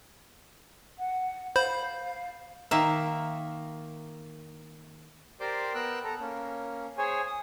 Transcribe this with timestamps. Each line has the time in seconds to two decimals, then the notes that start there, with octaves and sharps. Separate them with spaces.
0.99 F#5
1.56 C5 F5 B5 G6
2.71 D#3 A#3 E5
5.40 G4 A#4 C5 D5 C6 D6
5.74 B3 A#4 G5 E6 F#6
6.04 A4 A#5
6.20 A#3 C#4
6.98 G#4 C5 C#5 G#5
7.27 D#6